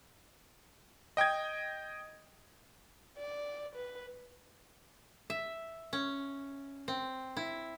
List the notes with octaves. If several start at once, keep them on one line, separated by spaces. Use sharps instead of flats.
D#5 G5 D#6 G#6
D5
B4
E5
C#4
C4
E4